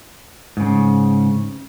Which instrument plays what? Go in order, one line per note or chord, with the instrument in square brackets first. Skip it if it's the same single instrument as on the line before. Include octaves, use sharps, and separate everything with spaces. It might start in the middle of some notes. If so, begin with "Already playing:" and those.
[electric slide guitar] G#2 C#3